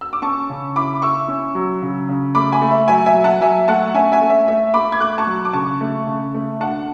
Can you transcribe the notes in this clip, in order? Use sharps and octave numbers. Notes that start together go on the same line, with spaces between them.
E6
D6
C#4 A5 C#6
C#3
E4 B5 D6
E4 C#6 E6
C#4
F#3
C#3
C#3
A3 B5 D6
G#5 B5
A3
E5
F#3 E5 G#5
E5 G#5
F#3
F#5 A5
F#3 E5 G#5
A3 F#5 A5
C#4 E5 G#5
E5 G#5
A3
E5
A3 E5
A3 B5 D6
G#6
A3 D6 F#6
A5 C#6
F#3
D6
C#3 A5 C#6
A3
C#3
A3
D4 F#5 A5